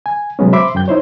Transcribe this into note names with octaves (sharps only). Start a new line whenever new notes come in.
G#5
C3 F#3 G#3 B3 C#4
C5 E5 B5 C6 D6
F#2 C#3 G5 G6
D#4 E4 C5 C#5